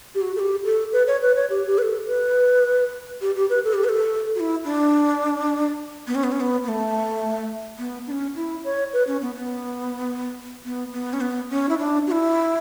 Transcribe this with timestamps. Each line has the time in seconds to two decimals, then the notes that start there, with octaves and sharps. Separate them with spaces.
0.15 G4
0.22 F#4
0.36 A4
0.39 G4
0.64 A4
0.93 B4
1.07 C#5
1.22 B4
1.36 C#5
1.50 G4
1.67 G4
1.78 B4
1.82 A4
2.08 B4
3.21 G4
3.36 G4
3.50 B4
3.64 A4
3.74 G4
3.84 B4
3.89 A4
4.35 F#4
4.40 E4
4.64 D4
6.07 B3
6.15 C#4
6.24 B3
6.32 C#4
6.40 B3
6.64 B3
6.68 A3
7.78 B3
8.07 D4
8.11 C#4
8.36 E4
8.64 C#5
8.93 B4
9.07 C#4
9.22 B3
9.36 B3
10.64 B3
10.92 B3
11.13 C#4
11.21 B3
11.50 C#4
11.69 E4
11.78 D4
12.07 F#4
12.11 E4